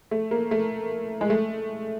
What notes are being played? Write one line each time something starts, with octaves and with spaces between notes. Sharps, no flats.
A3
A#3
A3
G#3
A3